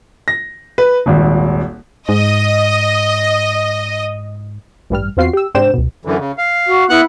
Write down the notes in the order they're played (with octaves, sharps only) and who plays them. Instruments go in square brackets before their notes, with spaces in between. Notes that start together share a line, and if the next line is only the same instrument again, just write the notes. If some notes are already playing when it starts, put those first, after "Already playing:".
[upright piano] A#6
B4
D#1 G#1
[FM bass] G#2 [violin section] D#5
[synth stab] A1 G2 G3 F6
E2 C4 F4 F#4 C7
G4 E6
G#2 C3 D4 C5 G5 E7
C#2 B2
[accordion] F#2 D3 E3
C#3
F5
[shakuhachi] F#4
[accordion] B3 F#5 F#6 [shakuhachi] E4